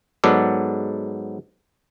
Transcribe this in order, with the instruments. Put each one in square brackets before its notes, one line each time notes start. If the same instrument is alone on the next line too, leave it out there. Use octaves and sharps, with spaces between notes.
[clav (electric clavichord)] G#2 F#3 B3 A4 D5